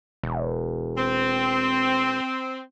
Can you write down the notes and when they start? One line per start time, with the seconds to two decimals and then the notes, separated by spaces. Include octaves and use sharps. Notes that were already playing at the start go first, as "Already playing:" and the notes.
0.23 E1
0.97 C4